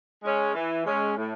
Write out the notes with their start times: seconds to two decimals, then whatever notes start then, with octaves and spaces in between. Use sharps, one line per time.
0.23 G#3 C#4
0.54 E3
0.85 G#3 C#4
1.17 A2